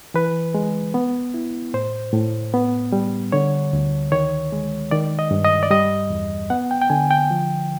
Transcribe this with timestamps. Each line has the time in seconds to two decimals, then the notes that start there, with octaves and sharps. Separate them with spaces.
0.14 E3 B4
0.54 G#3
0.94 B3
1.34 E4
1.74 A2 C5
2.13 A2
2.54 B3
2.92 G3
3.32 D3 C#5
3.73 D2
4.12 D#3 C#5
4.52 G#3
4.91 D#3 D5
5.19 D#5
5.31 G2
5.44 D#5
5.63 D5
5.71 G3 D#5
6.10 E2
6.50 B3 F#5
6.71 G5
6.82 G5
6.90 D3 G#5
7.11 G5
7.31 F3